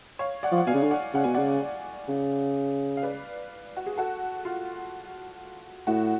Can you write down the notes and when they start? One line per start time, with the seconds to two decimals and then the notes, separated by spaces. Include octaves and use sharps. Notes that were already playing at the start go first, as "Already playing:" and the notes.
0.19 C#5 F5
0.43 D5 F#5
0.52 F3
0.58 F#5
0.67 B2 F5 G#5
0.74 C#3
0.83 D3
0.91 D5 F#5
1.14 C#3 F#5
1.24 B2 G#5
1.34 C#3 D5 F#5
2.09 C#3
2.97 F5
3.03 B4 D5
3.77 F#4
3.86 G#4
3.97 F#4 A4
4.45 F4
5.87 A2 F#4